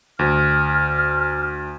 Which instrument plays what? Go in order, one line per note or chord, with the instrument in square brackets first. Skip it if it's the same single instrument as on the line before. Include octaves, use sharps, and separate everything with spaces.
[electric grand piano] D2 [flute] F6